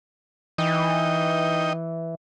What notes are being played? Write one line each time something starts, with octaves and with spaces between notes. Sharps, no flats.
E3 D#4 D#5 G5